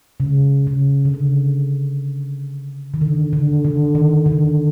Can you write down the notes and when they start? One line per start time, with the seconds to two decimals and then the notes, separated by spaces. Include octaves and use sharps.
0.20 C#3
0.67 C#3
1.05 D3
1.14 C#3
2.94 D#3
3.01 D3
3.33 D3
3.65 D3
3.95 D#3
4.26 D3